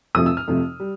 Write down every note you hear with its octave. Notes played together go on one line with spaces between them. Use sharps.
F2 C3 F3 A3 D#6
E6
F6
F2 C3 F3 A3
G3